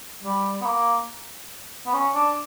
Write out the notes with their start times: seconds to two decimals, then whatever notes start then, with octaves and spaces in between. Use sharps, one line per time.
0.23 G3
0.61 B3
0.66 A#3
1.86 B3
1.93 C#4
2.15 D4